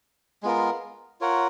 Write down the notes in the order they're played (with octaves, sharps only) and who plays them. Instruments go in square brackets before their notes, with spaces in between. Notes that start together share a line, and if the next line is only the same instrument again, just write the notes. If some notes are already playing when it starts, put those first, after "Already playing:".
[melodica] G#3 B3 F4 A#4
F4 A#4 C#5 F#5